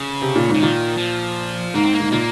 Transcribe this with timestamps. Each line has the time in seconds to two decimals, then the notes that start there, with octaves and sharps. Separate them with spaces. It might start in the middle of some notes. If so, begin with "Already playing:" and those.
Already playing: C#3
0.22 C3
0.36 A#2
0.49 G#2
0.54 C#3
0.60 A#2 D#3
0.97 F3
1.74 G#2 A#3
1.83 C4
1.93 A#3
2.00 G#2
2.12 A#2 A#3